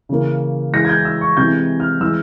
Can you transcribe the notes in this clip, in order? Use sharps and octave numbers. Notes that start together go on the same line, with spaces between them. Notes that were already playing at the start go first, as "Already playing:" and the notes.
C#3 E3 A#3
E3 G#3 A#6
G#6
G6
E6
C#6
C3 E3 G#3 G6
F6
E3 G#3 E6